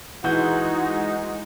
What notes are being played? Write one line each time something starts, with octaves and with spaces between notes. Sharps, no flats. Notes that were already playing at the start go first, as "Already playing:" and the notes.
E3 G#3 D#4 F#4 F#5 G6